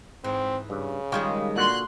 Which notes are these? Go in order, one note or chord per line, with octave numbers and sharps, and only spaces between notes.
G#2 E3 C4
G2 C#3
D#3 G3 G#3 F4 C#5 G5
A#2 D3 F#4 C6 F#6